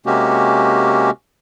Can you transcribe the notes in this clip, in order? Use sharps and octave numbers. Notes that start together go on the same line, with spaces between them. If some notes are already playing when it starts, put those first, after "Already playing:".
C3 G#3 A#3 C#4 F#4 G4